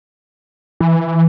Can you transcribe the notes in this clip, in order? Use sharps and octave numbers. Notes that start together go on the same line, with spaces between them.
E3